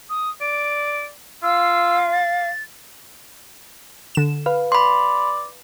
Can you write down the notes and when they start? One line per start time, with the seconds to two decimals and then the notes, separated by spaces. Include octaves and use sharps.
0.10 D#6
0.41 D5 D7
1.43 F4 F5 E6
2.13 A6
4.15 D3 E7
4.46 B4 F5
4.72 D5 B5 C6